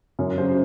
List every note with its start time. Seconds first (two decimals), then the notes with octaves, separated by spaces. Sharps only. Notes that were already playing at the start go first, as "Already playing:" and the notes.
0.19 F#2
0.38 C#3 F#3 C5